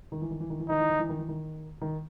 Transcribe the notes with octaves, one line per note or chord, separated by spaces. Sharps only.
D#3
E3
D#3
E3
D#3
E3
D#3 D#4
E3
D#3
E3
D#3
E3
D#3
D#3